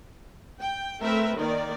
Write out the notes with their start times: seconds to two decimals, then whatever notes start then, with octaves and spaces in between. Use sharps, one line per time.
0.61 G5
1.01 A3 C4 A#4 B4 E5
1.37 D#3 A#3 A#4 D5